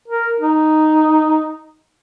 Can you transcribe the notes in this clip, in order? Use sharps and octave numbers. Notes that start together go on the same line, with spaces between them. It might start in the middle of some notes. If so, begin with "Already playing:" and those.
A#4
D#4